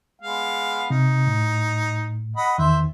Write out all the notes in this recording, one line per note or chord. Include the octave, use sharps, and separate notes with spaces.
G#3 B3 F5
C3 D#4
A2
D#5 F#5 B5
E2 D#3 C5 E5